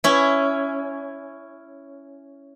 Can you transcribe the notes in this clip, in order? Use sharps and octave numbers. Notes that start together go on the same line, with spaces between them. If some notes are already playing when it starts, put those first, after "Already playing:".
C#4 E4